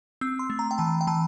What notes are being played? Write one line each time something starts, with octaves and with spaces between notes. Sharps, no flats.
C4 E6
C6
A3
A#5
G5
E3 A5
G5
E3 A5